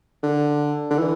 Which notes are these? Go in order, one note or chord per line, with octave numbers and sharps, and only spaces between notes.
D3
D3
E3